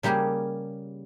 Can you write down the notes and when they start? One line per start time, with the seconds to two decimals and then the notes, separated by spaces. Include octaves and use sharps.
0.03 C#3 G3 A#3 G4 G#4